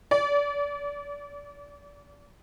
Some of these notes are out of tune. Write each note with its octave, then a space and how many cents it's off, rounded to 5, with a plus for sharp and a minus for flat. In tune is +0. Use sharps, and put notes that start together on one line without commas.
D5 -35